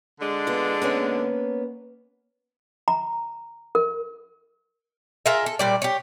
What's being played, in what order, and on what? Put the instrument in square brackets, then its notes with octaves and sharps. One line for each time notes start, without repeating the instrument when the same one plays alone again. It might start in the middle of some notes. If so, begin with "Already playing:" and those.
[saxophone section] D3 G#3 D4
[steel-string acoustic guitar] B3 F4
A#3 B3 C#4
[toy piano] A#5
A#4
[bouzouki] F4 G#4 A#4 E5
A4
A#2 G3 D5
G4 C#5